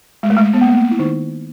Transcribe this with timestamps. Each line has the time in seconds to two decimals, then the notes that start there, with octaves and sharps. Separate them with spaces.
0.23 G#3
0.30 A3
0.37 G#3
0.54 B3
0.62 A#3
0.69 A3
0.77 A#3
0.91 E4
0.99 D#3 D#4